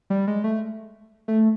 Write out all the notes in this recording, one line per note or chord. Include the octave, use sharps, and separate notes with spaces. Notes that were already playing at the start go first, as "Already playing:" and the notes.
G3
G#3
A3
A3